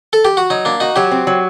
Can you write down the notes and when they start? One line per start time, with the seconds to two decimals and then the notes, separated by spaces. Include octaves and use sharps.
0.13 A4
0.25 G4
0.37 F#4
0.50 F#3 D#4
0.65 A#3 D4
0.80 D#4 F#4
0.96 F#3 G4
1.11 C4
1.27 F#3